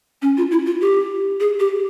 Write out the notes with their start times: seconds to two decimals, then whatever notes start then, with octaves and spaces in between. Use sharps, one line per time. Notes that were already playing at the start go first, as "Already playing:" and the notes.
0.22 C#4
0.37 F4
0.51 E4
0.66 F4
0.81 G4
1.40 G#4
1.60 G4